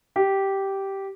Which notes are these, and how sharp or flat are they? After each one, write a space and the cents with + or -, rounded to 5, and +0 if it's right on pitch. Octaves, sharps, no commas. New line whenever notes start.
G4 -10